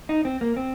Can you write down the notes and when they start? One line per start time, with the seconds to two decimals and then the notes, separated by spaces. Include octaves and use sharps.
0.09 D#4
0.25 C4
0.41 A#3
0.56 C4